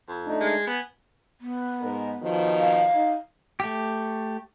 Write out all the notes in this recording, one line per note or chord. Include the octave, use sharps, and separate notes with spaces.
F2
A3 D4 D#4
G#3
B3 G#5
B3
G#2 A#4
B2 D#3 F3
F5
D#4
A3 G4